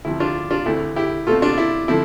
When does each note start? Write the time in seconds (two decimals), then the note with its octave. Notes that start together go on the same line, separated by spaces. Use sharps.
0.05 D2 C3 F3 E4
0.20 D4 F4
0.50 D4 F4
0.66 D2 D3 A3 C4 E4
0.96 E4 G4
1.27 B2 A3 C4 F4 A4
1.42 D4 F4
1.58 E4
1.88 D3 F3 A3 C4 E4